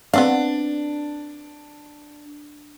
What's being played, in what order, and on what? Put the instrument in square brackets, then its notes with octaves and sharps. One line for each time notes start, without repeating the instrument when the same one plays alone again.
[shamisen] B3 C4 F5 [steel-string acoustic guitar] D4